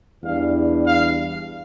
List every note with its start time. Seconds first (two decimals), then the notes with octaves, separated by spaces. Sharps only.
0.23 E2 E3 G3 D4 F5
0.87 F5